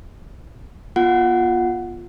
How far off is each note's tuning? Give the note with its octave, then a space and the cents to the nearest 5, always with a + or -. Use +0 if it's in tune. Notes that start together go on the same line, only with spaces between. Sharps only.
B3 -35 F4 +0 F#5 +0